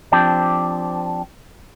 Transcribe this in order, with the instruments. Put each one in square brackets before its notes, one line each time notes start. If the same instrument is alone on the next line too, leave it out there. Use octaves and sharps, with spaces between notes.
[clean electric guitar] F3 C4 D4 G4